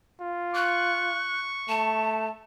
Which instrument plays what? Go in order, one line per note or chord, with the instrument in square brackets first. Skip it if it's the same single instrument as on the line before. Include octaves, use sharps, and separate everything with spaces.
[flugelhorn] F4
[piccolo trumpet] C#6 [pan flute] F#6
[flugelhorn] A3 [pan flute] A5